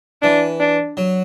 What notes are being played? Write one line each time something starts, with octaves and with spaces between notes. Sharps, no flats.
E3 D4
D4
F#3